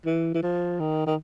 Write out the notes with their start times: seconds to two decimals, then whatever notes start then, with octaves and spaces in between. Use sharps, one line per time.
0.05 E3
0.34 E3
0.43 F3
0.80 D#3
1.06 D#3